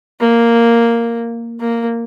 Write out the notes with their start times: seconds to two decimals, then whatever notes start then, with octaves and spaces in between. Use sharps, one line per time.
0.20 A#3
1.60 A#3